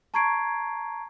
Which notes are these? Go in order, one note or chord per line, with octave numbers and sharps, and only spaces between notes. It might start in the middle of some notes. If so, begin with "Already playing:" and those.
A5 A#5 C#6 G#6 C7 D7